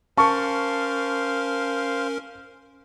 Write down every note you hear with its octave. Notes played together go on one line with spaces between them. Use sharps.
C#4 A#4 C5 F5 A5 C#6